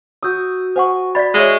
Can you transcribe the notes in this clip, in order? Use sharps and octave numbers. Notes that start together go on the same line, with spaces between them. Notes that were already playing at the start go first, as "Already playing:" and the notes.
F#4 D#6 E6 G6
C5 F#5 G#5 C#6
D5 B5 A6 B6
G#3 C#5 E5 F#5